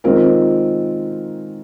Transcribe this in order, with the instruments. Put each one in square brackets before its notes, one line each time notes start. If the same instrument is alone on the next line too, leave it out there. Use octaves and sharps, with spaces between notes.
[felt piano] D#3 G#3 C4 F4 A#4